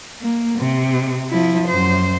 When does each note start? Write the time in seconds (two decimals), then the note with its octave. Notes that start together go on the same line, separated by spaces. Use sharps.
0.21 A#3
0.58 C3
1.30 F3 E4
1.68 F#2 C5